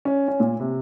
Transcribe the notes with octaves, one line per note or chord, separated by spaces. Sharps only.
C#4
C#4
A#2
C3